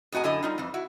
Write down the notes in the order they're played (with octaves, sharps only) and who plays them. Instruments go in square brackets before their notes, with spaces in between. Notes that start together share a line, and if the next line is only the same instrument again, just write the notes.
[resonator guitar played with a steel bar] F2 A2 F#4 D#5 G#5
F#2 D3 E4 D#5 G#5
G3 D#4 F4
F2 E3
E4 F#4